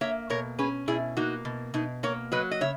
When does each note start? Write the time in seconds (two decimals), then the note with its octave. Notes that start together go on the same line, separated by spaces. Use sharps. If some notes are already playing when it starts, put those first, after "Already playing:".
0.01 A#3 C#5 E5
0.30 B2 A#4 C#5
0.58 C#4 G#4 B4
0.88 B2 E4 G#4
1.17 A#3 D#4 F#4
1.45 B2
1.74 B2 D#4
2.03 A#3 A#4 C#5
2.32 F#3 B4 D#5
2.51 D#5
2.61 C#3 C#5 E5